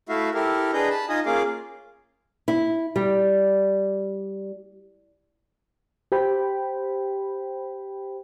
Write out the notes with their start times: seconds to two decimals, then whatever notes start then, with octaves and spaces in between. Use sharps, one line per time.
0.09 A3 E4 F#4 E5 F5
0.34 E4 G4 A4 A#4
0.73 D4 G#4 B4 D#5 G6
0.90 A5 B5
1.09 D#4 F4 D#5 G#5 D#6
1.26 A#3 C#4 F4 G#4 F5 D6
2.48 E4
2.96 G3
6.12 G4 C5 G5 B5